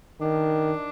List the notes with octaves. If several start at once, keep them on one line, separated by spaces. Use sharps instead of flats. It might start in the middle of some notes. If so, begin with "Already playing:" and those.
D#3 D4